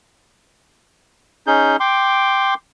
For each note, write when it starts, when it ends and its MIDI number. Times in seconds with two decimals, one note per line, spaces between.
1.47 1.76 61
1.47 1.76 63
1.47 1.76 68
1.47 1.76 91
1.80 2.54 79
1.80 2.54 84
1.80 2.54 86